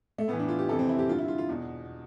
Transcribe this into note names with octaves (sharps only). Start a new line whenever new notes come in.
A3
A2 E3 B3
D4
F4
G4
F2 C3 E3 A4
C4
E4
G4
G2 D3 F4
E4
F4
F4
E2 B2